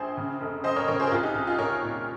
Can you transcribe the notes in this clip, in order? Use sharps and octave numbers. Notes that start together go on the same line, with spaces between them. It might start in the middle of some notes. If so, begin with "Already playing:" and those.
Already playing: A#1 G#4 C5
C#3
F1
F1 C5 D#5
A#4 C#5
C#3 A#4 C#5
G#4 C5
A#4
C2 F4 G#4
D#4 G4
C2
F4 G#4
C2 A#4 C#5
A#2